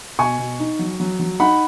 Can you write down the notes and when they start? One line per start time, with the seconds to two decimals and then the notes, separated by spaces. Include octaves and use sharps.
0.19 B2 G#5 C#6
0.39 B2
0.60 D#4
0.79 F#3
1.00 F#3
1.19 F#3
1.40 D#4 F#5 B5